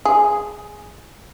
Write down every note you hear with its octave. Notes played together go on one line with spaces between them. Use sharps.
G#4